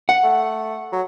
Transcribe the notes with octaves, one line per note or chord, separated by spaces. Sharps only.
F#5
A3
F#3